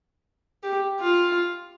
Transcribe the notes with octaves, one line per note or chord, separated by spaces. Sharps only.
G4
F4